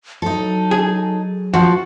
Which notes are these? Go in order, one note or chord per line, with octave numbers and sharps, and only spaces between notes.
F#3 D#4 A4
G#4
F3 F#4